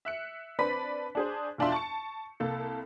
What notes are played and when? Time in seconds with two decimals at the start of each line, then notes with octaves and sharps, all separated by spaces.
0.05 E5 F#6 C#7
0.59 C4 D4 B4 D5 B5 B6
1.15 D4 G#4 C5
1.58 B1 E2 D4 F4 E5 C6
1.72 A5 C#6 C#7
2.40 C2 A#3 A4 A5